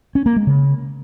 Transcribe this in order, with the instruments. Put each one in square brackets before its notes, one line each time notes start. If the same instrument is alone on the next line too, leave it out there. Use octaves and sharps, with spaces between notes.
[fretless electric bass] C#4
A#3
G#3
C#3